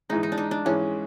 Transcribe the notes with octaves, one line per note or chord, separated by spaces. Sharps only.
G#2 E3 G#3 D#4
D#4
D4
D#4
D4
G#2 E3 G#3 C#4